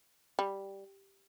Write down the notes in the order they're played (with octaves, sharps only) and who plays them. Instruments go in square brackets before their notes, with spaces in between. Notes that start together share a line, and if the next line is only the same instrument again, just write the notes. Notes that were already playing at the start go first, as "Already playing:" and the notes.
[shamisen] G3